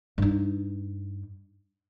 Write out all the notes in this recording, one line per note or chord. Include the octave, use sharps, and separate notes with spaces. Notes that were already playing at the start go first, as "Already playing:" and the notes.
G2 D#4